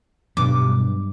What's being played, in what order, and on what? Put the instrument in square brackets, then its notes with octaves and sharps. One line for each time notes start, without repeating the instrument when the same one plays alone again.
[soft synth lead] G2 [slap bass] B2 F#3 G3 [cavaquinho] D6